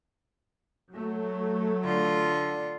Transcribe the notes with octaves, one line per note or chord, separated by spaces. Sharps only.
F#3 A3
D3 F4